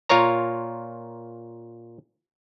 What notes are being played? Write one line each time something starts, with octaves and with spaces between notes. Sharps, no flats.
A#2 F4 A#4 C#5 A#5